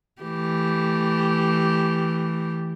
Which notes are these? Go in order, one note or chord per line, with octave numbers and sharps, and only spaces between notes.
E3 A3 G4